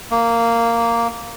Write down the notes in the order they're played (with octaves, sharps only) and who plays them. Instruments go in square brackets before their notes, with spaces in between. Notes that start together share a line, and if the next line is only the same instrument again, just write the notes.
[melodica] A#3